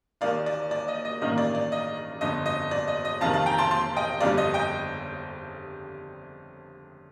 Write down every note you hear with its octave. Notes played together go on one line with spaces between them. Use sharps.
D#2 D#3 A#3 D#4 D5 F5
D5
D5
D#5
D#5
A1 G2 D#3 A#3 D#4 D#5
D5
D5
D#5
G1 F2 D3 D#5
D#5
D5
D#5
D#5
F2 C3 D#3 F5 A5
F5 A5
G5 A#5
A5 C6
A5 C6
D#5 G5
G1 F2 D3 G3 D5 F5
D#5
D#5 G5